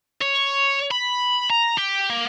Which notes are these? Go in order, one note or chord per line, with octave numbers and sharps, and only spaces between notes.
C#5
B5
A#5
G4
A#3